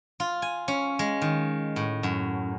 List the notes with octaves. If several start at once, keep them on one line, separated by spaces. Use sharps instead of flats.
F4
G#5
C#4
G#3
D#3
A2
F#2